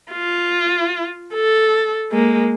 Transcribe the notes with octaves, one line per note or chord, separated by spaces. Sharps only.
F4
A4
G#3 A#3